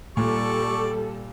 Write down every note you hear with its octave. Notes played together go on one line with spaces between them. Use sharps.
A#2 G3 A4 D5 C#6